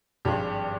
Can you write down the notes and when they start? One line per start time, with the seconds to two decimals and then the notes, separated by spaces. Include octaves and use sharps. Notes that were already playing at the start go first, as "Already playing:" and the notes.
0.25 G#1 G2 F3 G#3 G4